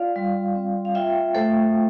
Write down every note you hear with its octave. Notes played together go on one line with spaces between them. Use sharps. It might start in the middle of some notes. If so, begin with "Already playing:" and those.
Already playing: F4 D5 F5
G3
C4
F5
F4 E5 G5
A3 A4 C5